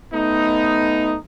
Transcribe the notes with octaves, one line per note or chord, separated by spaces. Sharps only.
A3 B3 D#4